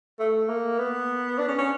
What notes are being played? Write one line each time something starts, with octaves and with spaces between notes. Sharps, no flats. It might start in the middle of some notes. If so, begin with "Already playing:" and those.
A3
A#3
B3
D4
C#4
C#4